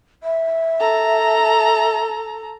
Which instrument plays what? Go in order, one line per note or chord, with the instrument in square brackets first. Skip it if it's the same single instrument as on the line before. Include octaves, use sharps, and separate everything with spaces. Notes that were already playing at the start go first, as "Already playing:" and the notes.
[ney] E5
[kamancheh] A4 A#5